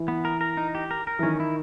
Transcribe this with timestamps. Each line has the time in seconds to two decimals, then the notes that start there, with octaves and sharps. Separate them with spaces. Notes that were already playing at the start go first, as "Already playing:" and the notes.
Already playing: E3
0.08 B3
0.25 A#4
0.41 A#4
0.57 D#4
0.75 G4
0.91 A#4
1.07 A#4
1.19 E3
1.23 D#3 C#4
1.40 E4